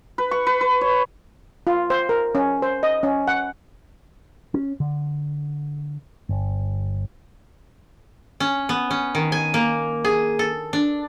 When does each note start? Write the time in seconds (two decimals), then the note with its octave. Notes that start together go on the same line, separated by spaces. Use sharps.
0.18 B4
0.31 C#6
0.47 B4
0.61 B4
0.81 C#5
1.67 F4
1.90 C5
2.09 A#4
2.35 C#4
2.62 C5
2.83 D#5
3.03 C#4
3.28 F#5
4.54 C#4
4.80 D3
6.29 G1
8.40 C#4
8.69 B3
8.90 C#4
9.15 D#3
9.32 G#5
9.54 A#3
10.05 G#4
10.39 A4
10.73 D4